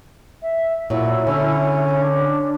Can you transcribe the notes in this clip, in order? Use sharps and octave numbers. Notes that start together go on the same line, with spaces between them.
E5
A#2 F#3 E4
D3 C#4
D4